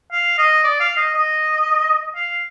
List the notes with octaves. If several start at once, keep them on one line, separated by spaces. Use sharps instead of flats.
F5
D#5
D5
F5
D#5
D#5
F5